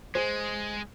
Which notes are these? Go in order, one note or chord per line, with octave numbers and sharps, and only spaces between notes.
G#3 G#4 C5